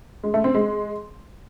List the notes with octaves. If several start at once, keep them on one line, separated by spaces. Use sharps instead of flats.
G#3
A3
C4
G#3